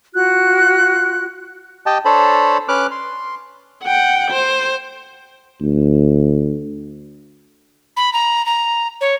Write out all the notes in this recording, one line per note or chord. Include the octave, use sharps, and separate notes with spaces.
F4 F#4 F#6
G4 D#5 G5 A5
D4 A4 C5 C#5 A5 B5
C#4 B4 D6 F6 F#6
C6
F#5 G5
C5
D2
B5
A#5
A#5
C#5